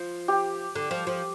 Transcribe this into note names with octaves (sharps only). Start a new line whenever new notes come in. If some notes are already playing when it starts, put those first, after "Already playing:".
Already playing: F3
G4
D3
F3
F3